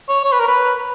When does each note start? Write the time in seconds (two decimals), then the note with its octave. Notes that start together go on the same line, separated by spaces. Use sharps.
0.09 C#5
0.25 C#5
0.32 B4
0.40 A#4
0.48 B4